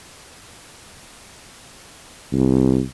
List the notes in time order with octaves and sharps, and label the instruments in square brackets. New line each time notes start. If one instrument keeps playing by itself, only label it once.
[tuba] C2